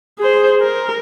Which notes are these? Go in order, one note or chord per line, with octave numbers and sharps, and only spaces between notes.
G#4 C5
A#4